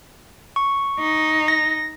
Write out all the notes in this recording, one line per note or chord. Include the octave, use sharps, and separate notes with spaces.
C#6
D#4
A#6